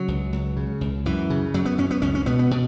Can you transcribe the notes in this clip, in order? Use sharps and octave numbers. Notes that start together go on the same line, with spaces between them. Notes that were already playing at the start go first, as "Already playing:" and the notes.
Already playing: C#3 F#3
C#2
C#2
C#3
C#2
F#2 E3
C#3
F#2 F#3
B3
F#2 C#4
B3
C#2 C#4
C#4
B2 B3
B3
B2